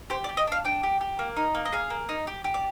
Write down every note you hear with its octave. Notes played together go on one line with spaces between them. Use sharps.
G4 C5
D5
G4
D#5
D4 F5
D4 G5
G4
G4
A#3
D#4
A#3
D#5
G#4 F5
A#3
D#4
G4
G4
D5